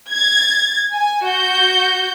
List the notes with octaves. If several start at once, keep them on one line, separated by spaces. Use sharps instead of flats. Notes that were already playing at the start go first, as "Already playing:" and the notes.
G#6 A6
G#5
F#4 G6